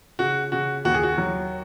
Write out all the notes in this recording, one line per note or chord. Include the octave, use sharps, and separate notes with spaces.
C#3 F#4
C#3 F#4
D#2 F#4
G#4
F#4
F#3